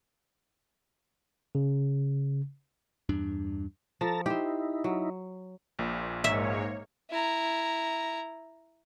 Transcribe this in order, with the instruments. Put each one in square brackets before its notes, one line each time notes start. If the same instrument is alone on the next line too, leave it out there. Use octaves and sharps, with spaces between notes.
[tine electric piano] C#3
[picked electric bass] E2 G2 D4
[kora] F3 [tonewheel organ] A4 A5 A#5
[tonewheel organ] D#4 E4 [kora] G4 C5
[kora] F#3
[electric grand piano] A#1 A#2
[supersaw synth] G#2 A#3 C#5 [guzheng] E5
[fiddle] E4 A#5